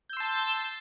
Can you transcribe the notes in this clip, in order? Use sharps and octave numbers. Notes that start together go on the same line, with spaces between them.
A5 C6 E6 G6